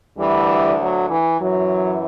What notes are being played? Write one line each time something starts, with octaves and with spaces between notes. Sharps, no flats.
D2 D3 E3 G3
F#3
E3
F#2 E3 F#3